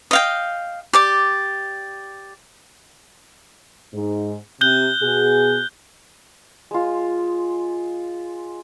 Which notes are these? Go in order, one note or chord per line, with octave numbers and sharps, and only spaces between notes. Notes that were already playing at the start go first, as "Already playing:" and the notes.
D#5 F5 G5
G4 D5 D6
G#2
C3 F#6 G6 G7
B2 G#4
G#3 F4